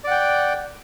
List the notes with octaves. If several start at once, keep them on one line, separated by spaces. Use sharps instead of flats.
D5 F#5 G5